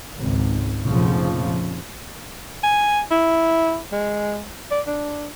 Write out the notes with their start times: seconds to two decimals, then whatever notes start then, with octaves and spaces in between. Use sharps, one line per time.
0.18 G#1 C#2
0.83 F1 A#1 C#3 F3
2.63 G#5
3.11 E4
3.92 G#3
4.71 D5
4.87 D4